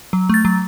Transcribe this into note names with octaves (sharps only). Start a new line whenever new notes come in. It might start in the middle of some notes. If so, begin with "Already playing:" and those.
F#3
A3 A6
F#3